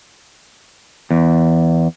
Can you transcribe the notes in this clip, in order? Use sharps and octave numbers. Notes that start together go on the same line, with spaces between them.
E2